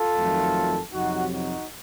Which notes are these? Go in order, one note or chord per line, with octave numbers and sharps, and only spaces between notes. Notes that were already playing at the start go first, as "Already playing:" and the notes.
Already playing: F4 A4
F2 D#3 F#3 A3
F2 C3 F#3 D#4 F#4
D#4 F#4